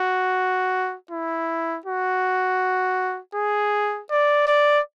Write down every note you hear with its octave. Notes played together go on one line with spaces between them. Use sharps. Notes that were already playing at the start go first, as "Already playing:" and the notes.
Already playing: F#4
E4
F#4
G#4
D5
D5